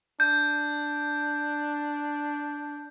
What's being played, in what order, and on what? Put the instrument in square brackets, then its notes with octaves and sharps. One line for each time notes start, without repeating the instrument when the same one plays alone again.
[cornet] D4 [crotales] G6